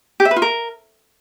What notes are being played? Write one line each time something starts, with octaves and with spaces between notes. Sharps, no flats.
G4
E5
B4
F4
A#4